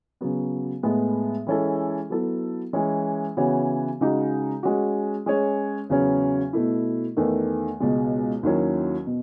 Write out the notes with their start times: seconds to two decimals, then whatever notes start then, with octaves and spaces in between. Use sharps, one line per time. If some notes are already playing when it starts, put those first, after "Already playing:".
0.21 C#3 F#3 B3
0.83 A2 G#3 B3
1.47 E3 G#3 C#4 E4 A4
2.10 F#3 B3 E4 A4
2.73 E3 G#3 C#4 E4
3.37 C#3 E3 B3 F#4 C#5
4.01 C#3 G#3 D#4 F#4
4.63 G#3 C#4 F#4
5.26 G#3 C#4 G#4 C#5
5.89 E2 C#3 F#3 C#4
6.53 B2 A3 E4
7.17 E2 D#3 A3
7.80 C#2 B2 G#3
8.43 D#2 D#3 F#3 C#4 E4
9.07 B2